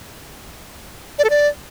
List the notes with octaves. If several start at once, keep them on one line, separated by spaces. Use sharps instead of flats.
D5
A4
D5